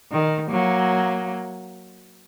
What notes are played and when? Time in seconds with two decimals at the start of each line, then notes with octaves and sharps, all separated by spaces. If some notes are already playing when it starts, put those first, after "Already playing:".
0.12 D#3
0.50 F#3 A#3